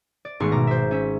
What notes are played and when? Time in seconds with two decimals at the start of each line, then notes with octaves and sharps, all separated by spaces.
0.25 D5
0.40 G#1 A3 B3 D#4 C6 C#6
0.52 B2 A#5 D6
0.67 C5 E5
0.91 C#4 E5